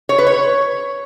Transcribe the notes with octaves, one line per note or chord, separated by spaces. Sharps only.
C#5
B4
C#5